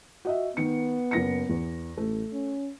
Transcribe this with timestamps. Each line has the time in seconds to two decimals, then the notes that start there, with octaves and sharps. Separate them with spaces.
0.25 F#4 D#5 E5
0.57 D#3 B3 C#7
1.11 F#1 A#6 C#7
1.49 E2
1.98 A1 A3
2.33 C#4